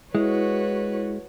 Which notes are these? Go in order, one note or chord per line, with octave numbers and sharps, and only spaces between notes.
G#3 E4 F#4 B4 C#5